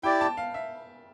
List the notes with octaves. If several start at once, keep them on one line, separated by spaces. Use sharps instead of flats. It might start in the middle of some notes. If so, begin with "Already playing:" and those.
E4 G4 D5 G5
A5
F5
E5